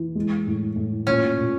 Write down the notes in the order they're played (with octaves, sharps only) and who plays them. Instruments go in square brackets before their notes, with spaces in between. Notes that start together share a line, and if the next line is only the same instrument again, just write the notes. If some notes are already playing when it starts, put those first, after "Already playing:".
Already playing: [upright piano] E3
G#3
A2
A2
[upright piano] A#2 [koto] C#4
[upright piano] A#2